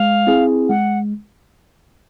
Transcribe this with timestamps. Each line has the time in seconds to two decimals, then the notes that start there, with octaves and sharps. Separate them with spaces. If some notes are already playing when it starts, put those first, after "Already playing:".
Already playing: G#3 F5
0.27 C4 E4 G#4
0.69 G#3 F#5